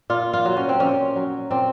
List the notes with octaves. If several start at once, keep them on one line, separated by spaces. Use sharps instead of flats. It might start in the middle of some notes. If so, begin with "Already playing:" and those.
A#2 F4
F4
F#3
C#4
C4
A#2 C#4
F#3
A#2 C4